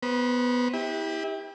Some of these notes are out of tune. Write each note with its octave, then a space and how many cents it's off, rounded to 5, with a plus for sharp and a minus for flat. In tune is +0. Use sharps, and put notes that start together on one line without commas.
B3 +0 C5 +0 B5 -35
E4 -30 G4 +20